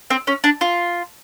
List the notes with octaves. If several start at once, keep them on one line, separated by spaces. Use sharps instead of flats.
C4
C#4
D4
F4